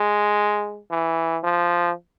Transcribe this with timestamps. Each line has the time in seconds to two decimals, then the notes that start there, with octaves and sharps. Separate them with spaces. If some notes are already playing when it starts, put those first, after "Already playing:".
Already playing: G#3
0.91 E3
1.44 F3